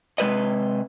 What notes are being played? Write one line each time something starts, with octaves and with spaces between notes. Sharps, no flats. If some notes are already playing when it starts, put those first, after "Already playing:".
C3 G#3 B4 D#5